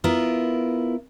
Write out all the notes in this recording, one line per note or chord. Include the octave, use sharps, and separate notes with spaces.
B3 E4 F4 A#4